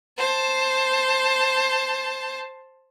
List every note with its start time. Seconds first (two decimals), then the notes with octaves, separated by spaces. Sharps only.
0.18 C5 A5